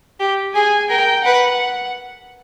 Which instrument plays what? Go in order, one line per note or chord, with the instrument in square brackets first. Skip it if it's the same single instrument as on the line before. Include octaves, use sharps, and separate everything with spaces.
[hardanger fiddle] G4
[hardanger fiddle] G#4 [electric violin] G#5
[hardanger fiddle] A#4 [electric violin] G5
[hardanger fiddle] B4 [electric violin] F#5